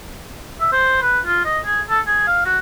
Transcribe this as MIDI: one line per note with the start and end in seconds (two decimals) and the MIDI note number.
0.61 0.68 76
0.72 0.98 72
1.02 1.19 71
1.25 1.40 65
1.45 1.59 75
1.65 1.81 68
1.90 2.00 69
2.07 2.24 68
2.27 2.45 77
2.46 2.59 66